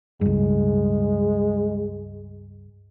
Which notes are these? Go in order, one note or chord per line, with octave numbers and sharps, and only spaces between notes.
C#2 G2 G#3